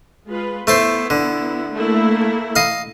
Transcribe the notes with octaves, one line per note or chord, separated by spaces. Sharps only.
G#3 F4 B4
A3 B3 E4 A4 C5
D3
A3 A#3 E4
D#5 F5